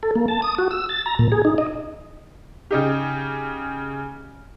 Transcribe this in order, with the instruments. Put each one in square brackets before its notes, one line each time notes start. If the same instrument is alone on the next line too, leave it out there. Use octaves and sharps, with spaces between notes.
[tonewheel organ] A4
A#3
A5
D#6
F#4
E6
A6
A#5
A#2
G#4
D#4
D#5
[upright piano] C#3 D#4 G4